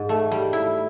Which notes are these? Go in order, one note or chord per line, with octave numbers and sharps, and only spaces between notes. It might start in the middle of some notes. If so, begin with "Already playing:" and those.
Already playing: G#2
A3
G3
E4